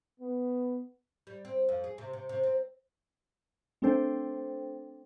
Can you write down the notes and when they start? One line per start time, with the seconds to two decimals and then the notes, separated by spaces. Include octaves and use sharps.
0.19 B3
1.27 G3
1.45 C4
1.69 F2
1.84 G#4
1.98 C3
2.13 C3
2.29 C3
2.43 C4
3.82 A3 C4 D4 A4 C5 G5